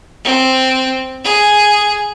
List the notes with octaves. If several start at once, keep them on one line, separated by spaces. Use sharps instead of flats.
C4
G#4